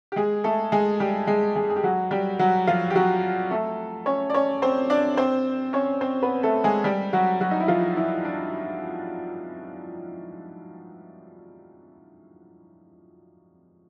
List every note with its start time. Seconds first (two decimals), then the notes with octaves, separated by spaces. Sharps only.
0.12 G4
0.16 G#3 G#4
0.44 A3 A4
0.72 G#3 G#4
1.00 G3 G4
1.27 G#3 G#4
1.55 G#3 G#4
1.70 G#4
1.76 G4
1.83 F#3 F#4
2.11 G3 G4
2.39 F#3 F#4
2.67 F3 F4
2.90 G4
2.95 F#3 F#4
3.51 A3 A4
4.06 C#4 C#5
4.30 D5
4.34 C#4 C#5
4.62 C4 C5
4.90 D4 D5
5.17 C4 C5
5.73 C#4 C#5
6.01 C4 C5
6.22 B3 B4
6.43 A3 A4
6.64 G#3 G#4
6.84 G3 G4
7.13 F#3 F#4
7.40 F#3 F#4
7.51 D#4
7.60 E4
7.68 F3 F4
7.96 E3 E4
8.24 D4